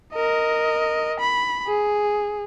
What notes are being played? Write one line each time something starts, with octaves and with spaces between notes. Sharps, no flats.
A#4 D#5
B5
G#4